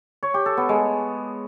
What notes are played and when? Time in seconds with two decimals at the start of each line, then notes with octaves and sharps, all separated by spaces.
0.23 C#5
0.34 G4
0.46 A4
0.57 B3
0.69 G#3